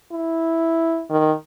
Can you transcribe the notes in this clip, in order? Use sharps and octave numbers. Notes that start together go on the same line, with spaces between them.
E4
D#3